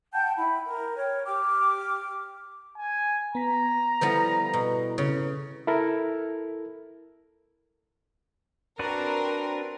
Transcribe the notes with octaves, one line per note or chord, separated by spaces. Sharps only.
F#5 G5 A5 G6
E4 F#5 B5
A#4
C#5 G5 F6
G4 G5 D6 F6
G#5
B3 A#5 B6
F3 G3 B3 E4 A4 B4
B2
C#3
E4 A4 A#4
C4 D4 F#4 A#4 B4